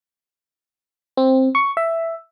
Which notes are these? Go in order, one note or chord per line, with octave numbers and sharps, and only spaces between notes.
C4
C#6
E5